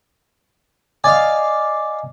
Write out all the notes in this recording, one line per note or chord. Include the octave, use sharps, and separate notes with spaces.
D5 D#5 F5 G#5